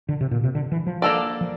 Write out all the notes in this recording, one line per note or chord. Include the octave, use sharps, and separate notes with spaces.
D3
C3
A#2
C3
D3
E3
F3
A#3 D4 A4 D5
F3